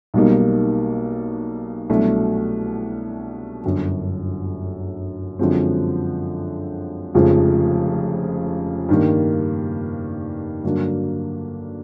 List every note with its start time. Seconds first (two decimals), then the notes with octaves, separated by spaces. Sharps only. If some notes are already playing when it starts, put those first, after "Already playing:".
0.14 B1 B2 G3 A#3 D#4
1.90 C2 B2 F#3 A3 D4
3.64 G1 F#2 D3 F#3
5.39 F#2 D3 F3 G#3 C4
7.14 F1 F2 C#3 F3 G#3
8.89 G2 D#3 G3 A#3
10.63 G2 D3 F#3 A#3 D4